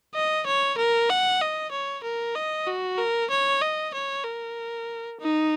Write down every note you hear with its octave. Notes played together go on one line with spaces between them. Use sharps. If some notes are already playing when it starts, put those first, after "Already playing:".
D#5
C#5
A#4
F#5
D#5
C#5
A#4
D#5
F#4
A#4
C#5
D#5
C#5
A#4
D#4